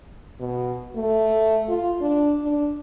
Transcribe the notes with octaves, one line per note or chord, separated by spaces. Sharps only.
B2
A3
F4
D4
D4